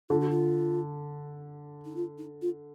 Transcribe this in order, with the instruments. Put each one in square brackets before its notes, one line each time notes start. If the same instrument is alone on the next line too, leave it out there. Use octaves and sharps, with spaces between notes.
[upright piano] D3 [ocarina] F4
[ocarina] F#4
F4
D#4
F4
D#4
F4